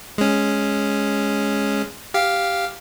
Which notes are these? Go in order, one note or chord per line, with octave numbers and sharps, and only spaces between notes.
G#3 C#4
G4 F5